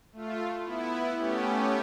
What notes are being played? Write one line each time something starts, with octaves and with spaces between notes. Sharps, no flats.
A3 F4
B3 E4
A3 B3 C#4 G4